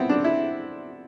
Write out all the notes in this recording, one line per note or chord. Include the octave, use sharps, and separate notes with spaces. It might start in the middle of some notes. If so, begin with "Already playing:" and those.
Already playing: B3 C4 E4
D4
E4